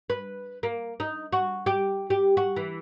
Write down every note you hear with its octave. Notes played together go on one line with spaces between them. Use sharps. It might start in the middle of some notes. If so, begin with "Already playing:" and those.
B4
A#3
D#4
F#4
G4
G4
F#4
E3